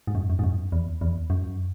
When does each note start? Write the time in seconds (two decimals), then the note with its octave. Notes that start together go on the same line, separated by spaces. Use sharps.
0.07 G#2
0.15 F#2
0.30 F#2
0.39 G#2
0.44 F#2
0.72 E2
1.01 E2
1.30 F#2